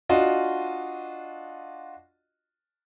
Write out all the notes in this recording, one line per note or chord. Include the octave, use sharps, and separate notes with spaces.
D4 F4 F#4 D#5